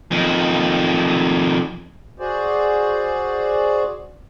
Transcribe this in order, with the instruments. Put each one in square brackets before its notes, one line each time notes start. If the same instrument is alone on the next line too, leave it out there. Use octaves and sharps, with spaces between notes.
[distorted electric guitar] F2 D#3
[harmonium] F#4 G#4 C5 D5